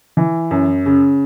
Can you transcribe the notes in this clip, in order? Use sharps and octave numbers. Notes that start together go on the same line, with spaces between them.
E3
F#2
C#3